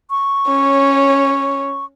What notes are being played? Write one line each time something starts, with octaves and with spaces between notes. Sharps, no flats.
C#6
C#4 C#5